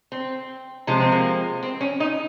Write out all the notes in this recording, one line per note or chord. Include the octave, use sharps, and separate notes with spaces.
C4
C3 F3 G#3
C4
A#3
C4
C#4
D#4